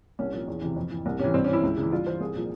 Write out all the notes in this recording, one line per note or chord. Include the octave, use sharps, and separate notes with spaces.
C2 C#4
A#2 F3 C#4
E2
C3 E3
F2
E3
C2
C3 E3 C#4
G2 C4
E3 C#4
E4
C#2
C#3
E3
G2 F4
E3 C5
C2 G#4
A#2 F3